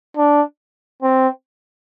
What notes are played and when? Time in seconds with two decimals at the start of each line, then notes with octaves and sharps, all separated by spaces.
0.17 D4
1.02 C4